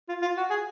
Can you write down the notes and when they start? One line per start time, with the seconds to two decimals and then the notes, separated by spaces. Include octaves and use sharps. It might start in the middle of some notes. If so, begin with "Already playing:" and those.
0.09 F4
0.22 F4
0.37 F#4
0.50 G#4